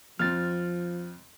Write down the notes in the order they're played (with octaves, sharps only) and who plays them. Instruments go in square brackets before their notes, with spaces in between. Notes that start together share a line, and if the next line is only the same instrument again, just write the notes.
[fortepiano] F2 C4 [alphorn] F3 [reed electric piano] F6 A6